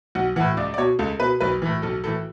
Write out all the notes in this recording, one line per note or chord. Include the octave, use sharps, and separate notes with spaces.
B1 F#5
A2 E3 F#5
C#2 D5
D5
B2 C#5
C#2 A4
B2 B4
B1 B4
A2 E3
B1 A4
A2 E3 A4